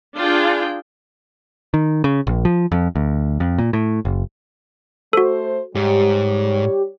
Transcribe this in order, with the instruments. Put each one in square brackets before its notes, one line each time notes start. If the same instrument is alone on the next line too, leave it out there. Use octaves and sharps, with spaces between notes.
[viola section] D4 F4 G#4 G5
[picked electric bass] D#3
C#3
A#1
F3
F2
D2
F2
A#2
A2
F#1
[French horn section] A3 C5 [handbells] F#4 A4
[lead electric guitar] G#2 [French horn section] G3 C#5 [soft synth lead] G4